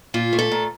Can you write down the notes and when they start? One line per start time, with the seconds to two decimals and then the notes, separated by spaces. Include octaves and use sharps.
0.14 A#2 F4
0.33 A3
0.39 A4
0.52 A#2